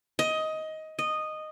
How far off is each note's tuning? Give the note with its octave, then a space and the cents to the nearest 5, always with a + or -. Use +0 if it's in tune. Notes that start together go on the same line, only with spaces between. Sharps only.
D#5 +15
D#5 -10